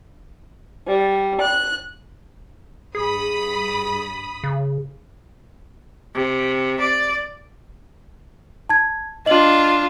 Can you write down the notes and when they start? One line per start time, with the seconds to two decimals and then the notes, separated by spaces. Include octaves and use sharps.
0.87 G3
1.40 F#6
2.95 G2 G#4 B5 D#6
4.44 C#3
6.15 C3
6.79 D5
8.69 A5 G#6
9.26 D4 F4 D#5 F#7